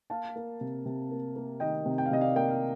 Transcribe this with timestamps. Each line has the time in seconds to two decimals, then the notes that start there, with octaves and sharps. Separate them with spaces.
0.10 A#3 F5 A5
0.36 A#3
0.61 C3
0.85 C3
1.11 A#3
1.36 A#3
1.60 D#3 D#5 G5
1.86 C3
1.98 G5
2.06 F5
2.11 C3 D#5
2.21 D5 F5
2.35 A#3 G5
2.48 F5